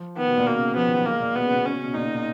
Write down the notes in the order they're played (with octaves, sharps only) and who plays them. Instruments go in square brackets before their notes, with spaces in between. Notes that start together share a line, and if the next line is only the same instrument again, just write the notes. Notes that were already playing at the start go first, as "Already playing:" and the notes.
Already playing: [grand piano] F3
[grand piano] D#3 [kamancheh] B3
[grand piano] B2
A#2
[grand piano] B2 [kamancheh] A#3
[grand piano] C#3
[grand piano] F3 [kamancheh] B3
[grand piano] D#3
F#3
[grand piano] G#3 [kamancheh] A#3
[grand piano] A#2
[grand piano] B2 [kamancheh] B3
[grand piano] C#3
B2
[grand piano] B2 [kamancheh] C#4
[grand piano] C#3
B2
[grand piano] A#2 [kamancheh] D#4
[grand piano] B2
A#2